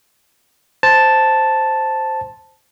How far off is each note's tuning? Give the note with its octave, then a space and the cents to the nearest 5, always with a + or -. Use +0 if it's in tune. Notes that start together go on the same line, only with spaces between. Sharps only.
C5 +0 A5 +0